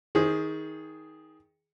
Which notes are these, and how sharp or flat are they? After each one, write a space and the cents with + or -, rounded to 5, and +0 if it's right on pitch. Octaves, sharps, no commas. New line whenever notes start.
D#3 +25 G#4 +0 C5 +0